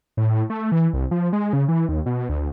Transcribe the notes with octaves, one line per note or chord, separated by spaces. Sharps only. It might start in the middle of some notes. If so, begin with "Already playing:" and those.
A2
A3
E3
C2
F3
G#3
C#3
E3
D#2
B2
D2